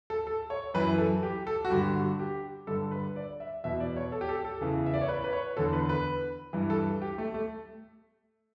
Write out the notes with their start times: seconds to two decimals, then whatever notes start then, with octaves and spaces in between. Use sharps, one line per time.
0.10 A4
0.27 A4
0.50 C#5
0.74 F#2 E3 B4
0.98 A4
1.23 G4
1.47 A4
1.65 F#4
1.70 G2 D3 G4
1.95 F#4
2.20 G4
2.67 G2 D3 A4
2.91 B4
3.16 D5
3.40 E5
3.64 E2 B2 E5
3.80 D5
3.96 C#5
4.12 A4
4.21 G4
4.29 A4
4.45 A4
4.61 E2 C#3 E3
4.86 E5
4.93 D5
5.01 C#5
5.08 B4
5.24 B4
5.33 C#5
5.57 E2 D3 A4
5.73 B4
5.89 B4
6.53 G2 E3
6.70 A4
7.02 G4
7.18 A3
7.34 A3